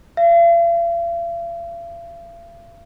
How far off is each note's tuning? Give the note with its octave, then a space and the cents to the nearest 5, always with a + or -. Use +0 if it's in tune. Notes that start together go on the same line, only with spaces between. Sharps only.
F5 -45